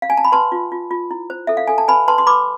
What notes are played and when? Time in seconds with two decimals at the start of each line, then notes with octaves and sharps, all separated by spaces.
0.02 F5
0.10 G#5
0.17 A5
0.25 B5
0.32 B4 A5 C6
0.52 F4
0.72 F4
0.91 F4
1.11 E4
1.30 C5
1.47 A4 E5
1.57 F5
1.67 A4 G#5
1.78 A5
1.88 B4 G#5 B5
2.08 B4 A5 C6
2.18 C6
2.27 B4 B5 D6